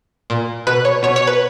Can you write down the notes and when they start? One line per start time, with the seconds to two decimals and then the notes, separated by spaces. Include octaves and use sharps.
0.30 A#2
0.67 B2 B4
0.85 C#5
1.03 B2 C#5
1.16 C#5
1.27 B4